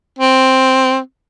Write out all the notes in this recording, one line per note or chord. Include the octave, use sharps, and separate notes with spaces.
C4